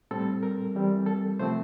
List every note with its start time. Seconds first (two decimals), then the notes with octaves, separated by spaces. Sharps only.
0.11 A2 G3 C4 A4
0.43 A#4
0.75 E3 G3 C4
1.06 A4
1.39 C3 F3 A3 C4 C5